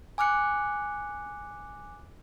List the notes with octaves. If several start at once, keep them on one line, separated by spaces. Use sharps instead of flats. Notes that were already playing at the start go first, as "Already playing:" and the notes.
G#5 D6 F6 F#6 C#7